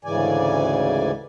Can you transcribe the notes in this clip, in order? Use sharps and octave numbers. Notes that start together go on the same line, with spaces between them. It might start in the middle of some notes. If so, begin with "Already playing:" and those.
D2 G#2 C#3 E3 D5 G#5